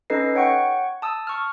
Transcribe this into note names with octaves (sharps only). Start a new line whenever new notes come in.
C#4 D#4 A4 B4 D#5 C7
C#5 F#5 G5 C#6 C#7
A5 D#6 E6
C#6 F6